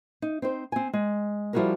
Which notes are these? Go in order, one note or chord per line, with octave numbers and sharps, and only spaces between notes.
D#4
C4 D#4 C5
C4 G#5
G#3
F3 G3 E4 F#4 G#4 A#4